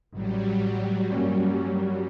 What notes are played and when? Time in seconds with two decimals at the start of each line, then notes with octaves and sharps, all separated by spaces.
0.13 A1 F#3 G3
1.10 G2 A#3 C#4